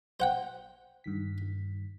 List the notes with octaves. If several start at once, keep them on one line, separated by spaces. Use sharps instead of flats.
C5 F#5 G5
G2 D#3 B6